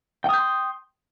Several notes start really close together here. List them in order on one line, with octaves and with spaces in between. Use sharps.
G5 D#6 G6 C6